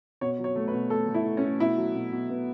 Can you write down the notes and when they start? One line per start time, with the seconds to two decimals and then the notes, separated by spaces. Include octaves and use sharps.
0.21 B2 C#5
0.39 F#3
0.44 C#5
0.56 A3
0.68 B4
0.74 B2
0.90 A3 A4
1.08 A3
1.14 E4
1.26 A3
1.37 C#4
1.43 A3
1.60 B2 E4
1.78 F#3
1.95 B2
2.12 B2
2.29 B3